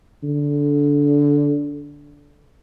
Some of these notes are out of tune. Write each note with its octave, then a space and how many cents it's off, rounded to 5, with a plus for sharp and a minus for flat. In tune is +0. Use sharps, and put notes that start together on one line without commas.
D3 -15